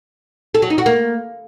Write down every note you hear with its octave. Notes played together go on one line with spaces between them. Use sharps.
A4
F#3
D#4
F#4
A#3